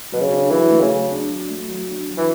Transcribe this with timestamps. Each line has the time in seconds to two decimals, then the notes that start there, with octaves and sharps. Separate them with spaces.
0.12 B2 F#3
0.21 C#3
0.31 D4
0.51 E3 F#3
0.70 A3
0.80 C#3
0.90 F#3
1.10 D4
1.29 F#3
1.49 A3
1.68 F#3
1.88 D4
2.08 F#3
2.17 E3